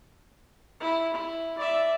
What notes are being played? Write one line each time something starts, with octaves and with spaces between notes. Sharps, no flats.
E4
E4
D5 E5